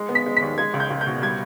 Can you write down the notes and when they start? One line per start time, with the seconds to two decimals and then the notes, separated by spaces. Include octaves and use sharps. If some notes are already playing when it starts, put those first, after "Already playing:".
Already playing: G#3
0.09 B3
0.15 B6
0.26 G#3
0.37 B6
0.42 D#2
0.58 G#3 G#6
0.74 C#2
0.80 G6
0.90 C#2
1.01 G6
1.07 B2
1.22 G3 G#6